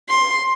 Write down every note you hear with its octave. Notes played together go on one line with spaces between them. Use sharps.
C6